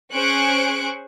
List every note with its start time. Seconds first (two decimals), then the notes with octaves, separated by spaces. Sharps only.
0.13 C#4 G#4 C5 C#6 F#6 D7